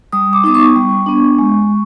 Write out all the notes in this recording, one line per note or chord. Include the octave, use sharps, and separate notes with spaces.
G3 D#6
D6
B3 D#4 D6
C#6
G3
B3 D4
G#3